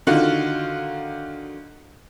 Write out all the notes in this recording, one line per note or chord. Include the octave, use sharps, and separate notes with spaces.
D3 D#3 F4 F#4